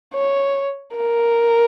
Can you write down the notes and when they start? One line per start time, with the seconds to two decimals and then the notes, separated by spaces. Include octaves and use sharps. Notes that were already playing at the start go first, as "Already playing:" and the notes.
0.14 C#5
0.96 A#4